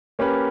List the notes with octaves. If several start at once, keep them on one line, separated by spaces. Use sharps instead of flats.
A#3 C#4 G4 B4